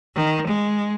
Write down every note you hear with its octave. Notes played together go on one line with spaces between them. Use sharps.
D#3
G#3